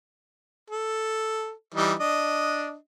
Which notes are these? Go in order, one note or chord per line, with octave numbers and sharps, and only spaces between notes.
A4
E3 G3 D#4
D4 D#5